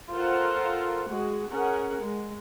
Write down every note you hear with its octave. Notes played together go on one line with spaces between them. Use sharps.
F4 A4 A#4 C5 F5 F#5
G#3 F#4 G#4
C#4 G#4 A#4 F#5
G#3